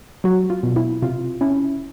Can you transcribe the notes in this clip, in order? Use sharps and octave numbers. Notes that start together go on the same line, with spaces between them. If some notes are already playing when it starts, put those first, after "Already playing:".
F#3 F#4
F4
B2
E4
C3 F4
C#4 E4